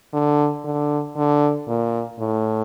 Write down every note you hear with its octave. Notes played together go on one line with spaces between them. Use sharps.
D3
D3
D3
A#2
A2